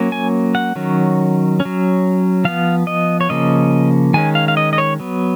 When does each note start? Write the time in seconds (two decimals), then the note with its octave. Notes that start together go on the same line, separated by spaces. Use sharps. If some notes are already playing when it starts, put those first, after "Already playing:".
Already playing: F#3 A#3 C#4
0.12 G#5
0.55 F#5
0.76 D#3 F#3 C#4
1.60 C#4
1.65 F#3
2.45 F3 B3 F5
2.87 D#5
3.21 C#5
3.29 C#3 F3 A#3 C#4 D#5
4.14 D#3 G#3 C#4 G#5
4.35 F5
4.48 F5
4.57 D#5
4.73 D#5
4.78 C#5
5.00 F#3 B3